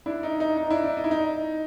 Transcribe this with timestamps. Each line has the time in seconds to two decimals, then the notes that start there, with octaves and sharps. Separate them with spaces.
0.06 D4 E4
0.23 D#4
0.40 D#4
0.57 D#4
0.70 D4 E4
0.83 D4
0.97 D#4
1.04 E4
1.11 D#4